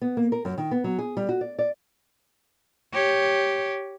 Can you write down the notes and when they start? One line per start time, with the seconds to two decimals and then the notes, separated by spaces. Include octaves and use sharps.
0.01 B3
0.17 A#3
0.32 A#4
0.45 F#2
0.58 D#3
0.71 B3
0.84 F#3
0.99 G#4
1.17 G3
1.29 F#4
1.41 D5
1.59 D5
2.93 G4 C#5